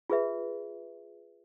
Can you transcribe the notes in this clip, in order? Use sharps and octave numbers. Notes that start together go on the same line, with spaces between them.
F4 G#4 B4 E5